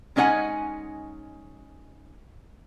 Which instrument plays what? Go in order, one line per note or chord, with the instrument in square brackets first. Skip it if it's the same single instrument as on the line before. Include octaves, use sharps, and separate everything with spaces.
[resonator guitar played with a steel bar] G#3 C#4 D#4 C5 F#5 G#5